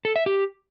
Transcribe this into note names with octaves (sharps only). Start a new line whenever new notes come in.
A4
E5
G4